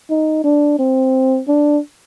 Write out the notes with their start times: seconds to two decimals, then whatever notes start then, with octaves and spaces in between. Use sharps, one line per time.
0.10 D#4
0.44 D4
0.79 C4
1.48 D4